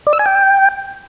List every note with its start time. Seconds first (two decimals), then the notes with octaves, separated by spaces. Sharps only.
0.07 D5
0.13 E6
0.19 G#5
0.26 G5